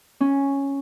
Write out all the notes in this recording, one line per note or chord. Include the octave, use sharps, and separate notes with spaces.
C#4